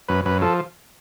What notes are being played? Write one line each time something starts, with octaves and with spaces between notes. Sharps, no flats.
F#2 B4
F#2 B4
F3 A4